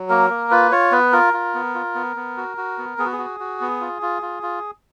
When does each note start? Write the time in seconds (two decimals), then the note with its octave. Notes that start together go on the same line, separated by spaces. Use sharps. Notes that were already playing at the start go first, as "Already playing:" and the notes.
Already playing: F#3
0.09 A#3 A#4
0.30 A#3
0.51 F4 B4
0.71 F4 C#5
0.91 B3 B4
1.12 F4 A#4
1.33 F4
1.55 B3
1.75 F4
1.95 B3
2.16 B3
2.37 F#4
2.57 F#4
2.78 B3
2.98 B3 G#4
3.05 F#4
3.12 G#4
3.19 F#4
3.40 F#4
3.61 B3
3.81 F4
4.02 F4
4.22 F4
4.43 F4